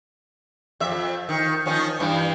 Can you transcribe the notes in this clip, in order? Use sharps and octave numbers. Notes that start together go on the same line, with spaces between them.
F2 E5
D#3
D#3 F3 C#4
G2 E3